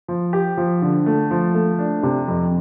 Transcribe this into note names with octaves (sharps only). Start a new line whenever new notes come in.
F3
G4
F3
D3
A3
F3
A3
D4
C3
F2